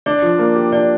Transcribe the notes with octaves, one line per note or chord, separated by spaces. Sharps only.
D4 D5
F3
A#3
G4
D4 D5